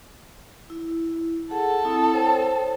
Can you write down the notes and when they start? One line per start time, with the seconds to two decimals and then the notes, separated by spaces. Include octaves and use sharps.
0.70 E4
1.51 G#4 A4 F#5
1.85 C4 E4 D#6
2.14 C5 C#5 G5